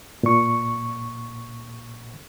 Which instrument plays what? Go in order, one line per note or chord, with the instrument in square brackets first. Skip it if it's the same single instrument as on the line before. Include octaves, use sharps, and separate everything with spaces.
[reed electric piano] A#2 C#6